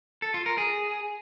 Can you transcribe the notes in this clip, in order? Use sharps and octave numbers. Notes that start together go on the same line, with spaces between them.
A4
F4
A#4
G#4